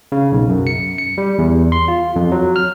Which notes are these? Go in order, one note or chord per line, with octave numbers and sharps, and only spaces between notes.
C#3
B1
F#2
C#7
C#7
G3
E2
C6
F4
F2
F#3
F6